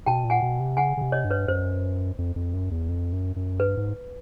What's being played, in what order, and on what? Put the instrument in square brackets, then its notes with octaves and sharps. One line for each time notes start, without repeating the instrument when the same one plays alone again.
[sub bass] B2 [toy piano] G5 A5
[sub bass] A#2
[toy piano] F#5 G#5
[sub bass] B2
C3
[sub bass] C#3 [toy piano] F#5 G#5
[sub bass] C#3
C3
[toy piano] C#5 D#5
[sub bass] G2
[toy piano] B4 C#5
[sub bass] F#2 [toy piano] C5
[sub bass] F2
F2
F#2
E2
F2
F#2
F#2
[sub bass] G2 [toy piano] B4
[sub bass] G#2